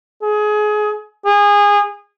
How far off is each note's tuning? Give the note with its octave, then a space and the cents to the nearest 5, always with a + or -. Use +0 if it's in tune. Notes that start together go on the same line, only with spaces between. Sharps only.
G#4 +25
G#4 -25